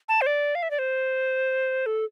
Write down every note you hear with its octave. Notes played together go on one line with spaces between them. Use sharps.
A5
C5
D5
F5
E5
D5
C5
A4